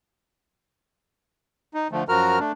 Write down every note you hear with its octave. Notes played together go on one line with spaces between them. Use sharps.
D#4
D3 F3 A3
F#2 F3 F#4 A#4 A#5 F6
A3 D4